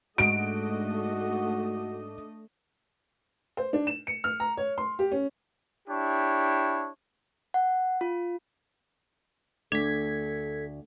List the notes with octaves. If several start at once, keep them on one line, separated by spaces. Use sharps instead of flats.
G#2 A3 D4 F#4 D#5 D7
C5
D4
E7
C#7
F6
A#5
C#5
C6
G4
C#4
D4 E4 G4 C#5
F#5
F4
D2 D4 A4 G#6 B6